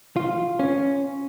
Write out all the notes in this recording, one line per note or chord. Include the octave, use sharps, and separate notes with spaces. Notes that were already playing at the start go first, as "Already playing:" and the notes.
F4
C#4